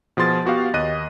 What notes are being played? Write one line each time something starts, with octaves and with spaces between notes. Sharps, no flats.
B2 F3 G#4 C6 A6
B3 F#4 G4 F5
D#2 D#5 F#6 D#7